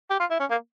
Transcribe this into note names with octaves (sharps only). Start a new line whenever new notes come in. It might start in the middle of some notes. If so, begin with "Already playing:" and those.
G4
F4
E4
C#4
A#3